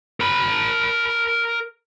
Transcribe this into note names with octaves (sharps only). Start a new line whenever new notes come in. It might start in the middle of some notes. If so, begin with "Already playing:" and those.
A#4 B5